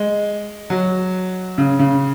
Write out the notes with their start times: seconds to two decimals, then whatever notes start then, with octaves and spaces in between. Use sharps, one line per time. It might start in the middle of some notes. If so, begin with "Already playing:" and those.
Already playing: G#3
0.70 F#3
1.58 C#3
1.79 C#3